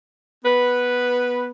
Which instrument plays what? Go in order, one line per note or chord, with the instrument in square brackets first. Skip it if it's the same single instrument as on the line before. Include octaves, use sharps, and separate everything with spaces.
[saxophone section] B3 B4